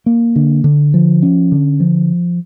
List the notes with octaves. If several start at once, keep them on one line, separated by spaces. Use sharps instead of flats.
A#3
D3
D3
F3
C#4
D3
F3